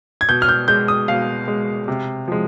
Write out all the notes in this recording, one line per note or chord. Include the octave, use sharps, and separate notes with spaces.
G#6
B2 G6
F6
G6
G#3 G6
D#6
B2 F5
G#3
C3
F3 G#3